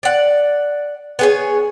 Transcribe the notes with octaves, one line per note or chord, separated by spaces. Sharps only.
D5 F#5
B3 G#4 C#5